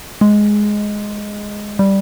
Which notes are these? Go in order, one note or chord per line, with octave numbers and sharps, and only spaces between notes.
G#3
G3